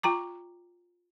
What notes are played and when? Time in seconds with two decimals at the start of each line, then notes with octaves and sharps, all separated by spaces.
0.03 F4 G5 A#5 D6